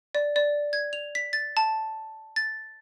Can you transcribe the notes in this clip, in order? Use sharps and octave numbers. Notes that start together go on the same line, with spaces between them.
D5
D5
G#6
F7
B6
A6
A5
A6